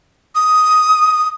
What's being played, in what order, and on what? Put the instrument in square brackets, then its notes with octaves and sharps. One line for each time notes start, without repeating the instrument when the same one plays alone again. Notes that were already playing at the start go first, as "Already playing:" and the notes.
[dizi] D#6